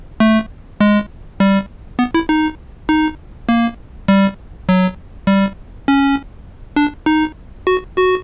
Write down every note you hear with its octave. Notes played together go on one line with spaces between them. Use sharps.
A3
G#3
G3
B3
E4
D#4
D#4
A#3
G3
F#3
G3
C#4
D4
D#4
F#4
F#4